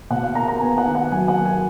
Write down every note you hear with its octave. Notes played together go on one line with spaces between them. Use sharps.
B2 F#5
F5
A#3 A#5
A#5
B3 G#5
F#5
D#3
F#5
F#3 G#5
F#5
A#3
G#5